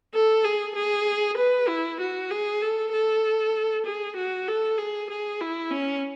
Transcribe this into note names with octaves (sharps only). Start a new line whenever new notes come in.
A4
G#4
G#4
B4
E4
F#4
G#4
A4
A4
G#4
F#4
A4
G#4
G#4
E4
C#4